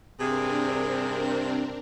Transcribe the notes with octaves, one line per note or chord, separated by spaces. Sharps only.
G2 C3 C4 D4 G#4 A#4